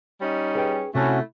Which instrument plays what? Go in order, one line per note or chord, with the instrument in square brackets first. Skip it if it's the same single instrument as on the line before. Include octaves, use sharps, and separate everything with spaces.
[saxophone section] G3 C#4 D#4
[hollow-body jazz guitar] G#4 B4 G5
[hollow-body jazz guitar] C3 A5 [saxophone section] A3 E4 [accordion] C#4 F#4